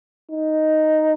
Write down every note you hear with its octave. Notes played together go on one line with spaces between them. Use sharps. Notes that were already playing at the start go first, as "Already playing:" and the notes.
D#4